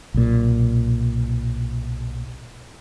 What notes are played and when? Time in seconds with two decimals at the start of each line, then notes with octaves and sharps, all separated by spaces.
0.14 B1 A#2